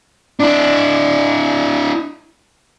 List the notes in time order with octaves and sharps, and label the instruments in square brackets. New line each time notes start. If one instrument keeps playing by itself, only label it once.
[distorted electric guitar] D4 E4